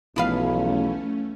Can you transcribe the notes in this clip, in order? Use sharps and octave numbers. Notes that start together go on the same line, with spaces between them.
B1 E2 F3 A3 C#4 B4 F5